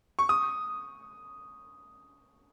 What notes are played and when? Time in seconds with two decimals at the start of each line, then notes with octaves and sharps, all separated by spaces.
0.19 C#6
0.29 D#6